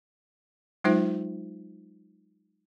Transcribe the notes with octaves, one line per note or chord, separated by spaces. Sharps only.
F#3 G#3 D#4 F4 C5 E5